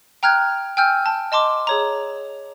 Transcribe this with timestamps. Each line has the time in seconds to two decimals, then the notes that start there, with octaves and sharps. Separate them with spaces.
0.23 G5 A#5 F6 F#6 G#6
0.77 G5 G#5 E6 F6 G6
1.06 A5
1.32 D#5 A5 C6 D6
1.67 G#4 C#5 A#5